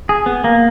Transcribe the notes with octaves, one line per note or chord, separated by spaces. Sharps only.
G#4
B3
A#3